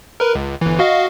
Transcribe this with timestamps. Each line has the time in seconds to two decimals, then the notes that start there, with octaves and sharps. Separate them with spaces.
0.20 A#4 B4
0.35 C#2
0.61 G1 E3
0.79 F#4 D#5 F5